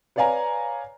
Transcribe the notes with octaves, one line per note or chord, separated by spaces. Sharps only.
B4 C#5 D5 F5 G#5 A#5